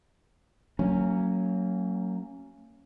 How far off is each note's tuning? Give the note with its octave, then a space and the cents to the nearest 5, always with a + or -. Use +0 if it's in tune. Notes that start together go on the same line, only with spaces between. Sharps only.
F#3 +5 A#3 -35 C#4 +0